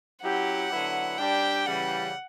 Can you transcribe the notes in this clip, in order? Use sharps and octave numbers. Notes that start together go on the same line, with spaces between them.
F#3 C#4 E4 G4 F#5
D3 F#3 B3 E4
G3 D4 G4 G5
C#3 E3 G3 F#5